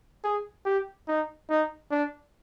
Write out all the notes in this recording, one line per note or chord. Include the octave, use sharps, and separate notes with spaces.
G#4
G4
D#4
D#4
D4